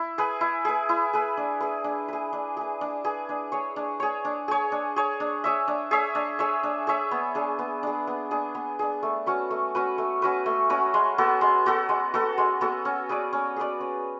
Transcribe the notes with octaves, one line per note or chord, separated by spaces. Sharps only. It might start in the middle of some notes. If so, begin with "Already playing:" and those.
Already playing: E4
G#4 B4
E4
G#4 B4
E4
G#4 B4
D4
G#4 B4
D4
G#4 B4
D4
G#4 B4
D4
G#4 B4
D4
G#4 C#5
D4
G#4 C#5
D4
G#4 C#5
D4
G#4 C#5
D4
G#4 C#5 E5
D4
G#4 C#5 E5
D4
G#4 C#5 E5
D4
G#4 C#5 E5
B3
D4 G#4
B3
D4 G#4
B3
D4 G#4
B3
D4 G#4
A3
C#4 F#4 B4
A3
C#4 F#4 B4
A3
C#4 F#4 B4
A3
C#4 F#4 B4
G#3
B3 F#4 A4
G#3
B3 F#4 A4
G#3
B3 F#4 A4
G#3
B3 F#4 A4
C#4
G#4 B4 D5
C#4
G#4 B4 D5
C#4